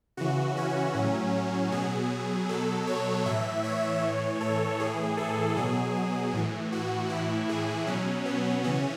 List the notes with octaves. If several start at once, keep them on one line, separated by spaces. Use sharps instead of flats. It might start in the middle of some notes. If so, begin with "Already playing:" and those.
C#3 E3 F#4
C#4
A2 F#3
B2 F#3 G#4
B2 F#3 A4
C#5
A2 E3 E5
C#5
A2 E3
A4
A2 E3 G#4
A4
B2 F#3 G#4
A2 E3
F#4
A2 E3 E4
G#4
B2 F#3 C#4
B3
C#3 E3 C#4